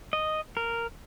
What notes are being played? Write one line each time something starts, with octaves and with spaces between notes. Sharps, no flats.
D#5
A#4